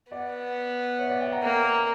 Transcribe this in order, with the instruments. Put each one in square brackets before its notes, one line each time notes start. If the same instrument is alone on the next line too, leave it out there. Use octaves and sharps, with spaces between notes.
[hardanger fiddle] B3 [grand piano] D5 F#5
[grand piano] C#5 E5
D5 F#5
E5 G5
F#5 A#5
[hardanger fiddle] A#3